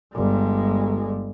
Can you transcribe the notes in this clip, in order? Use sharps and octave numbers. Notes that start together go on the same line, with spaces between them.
G1 G#3